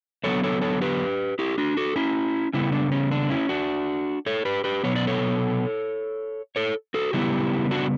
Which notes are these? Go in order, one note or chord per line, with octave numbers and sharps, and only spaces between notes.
D3 F#3 B3 A4 C#5
A4 C#5
A4 C#5
G4 B4
E4 G4
D4 F#4
F#4 A4
C#4 E4
C#3 G3 B3 C#4 E4
D4
C#4
D4
C#4 E4
D4 F#4
A4 C#5
G4 B4
G4 B4
B2 F#3 B3 C#5
D5
A4 C#5
A4 C#5
F#4 A4
C#3 G3 B3 E4 G4
D4 F#4